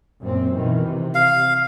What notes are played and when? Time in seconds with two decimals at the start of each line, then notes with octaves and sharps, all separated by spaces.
0.21 F#2 A#2 C4
0.54 B2 D#3 E3
0.84 C3
1.15 F5